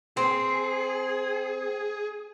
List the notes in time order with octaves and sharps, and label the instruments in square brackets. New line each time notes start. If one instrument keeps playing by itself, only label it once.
[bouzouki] C4 [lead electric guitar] G#4